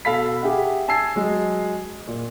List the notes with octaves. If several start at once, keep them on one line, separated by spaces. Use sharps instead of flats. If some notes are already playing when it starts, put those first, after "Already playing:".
B2 A4 F5 B5 B6
G4 G#4 E5 F#5
G#5 A5 E6 G#6 C7
F#3 G#3
A#2